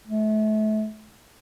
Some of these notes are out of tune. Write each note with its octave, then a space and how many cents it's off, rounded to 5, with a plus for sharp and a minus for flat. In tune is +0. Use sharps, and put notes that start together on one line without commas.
A3 -35